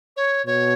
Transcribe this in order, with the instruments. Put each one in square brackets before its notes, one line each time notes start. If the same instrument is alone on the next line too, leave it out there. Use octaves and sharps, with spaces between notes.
[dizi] C#5
[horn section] B2 [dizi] C#5